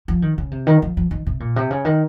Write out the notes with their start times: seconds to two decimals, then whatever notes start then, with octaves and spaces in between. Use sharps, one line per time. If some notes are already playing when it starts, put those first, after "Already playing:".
0.08 F3
0.22 D#3
0.38 C#3
0.51 C3
0.67 D#3
0.82 F3
0.97 F3
1.11 D#3
1.27 C3
1.40 A#2
1.56 C3
1.71 C#3
1.85 D#3